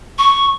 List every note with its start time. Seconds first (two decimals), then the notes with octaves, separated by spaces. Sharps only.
0.18 C#6